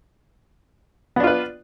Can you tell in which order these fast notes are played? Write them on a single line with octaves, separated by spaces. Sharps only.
B3 D4 F4 B4